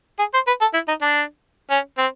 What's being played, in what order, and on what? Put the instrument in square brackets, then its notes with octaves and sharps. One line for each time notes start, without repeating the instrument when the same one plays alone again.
[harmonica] G#4
C5
B4
A4
E4
D#4
D4
C#4
C4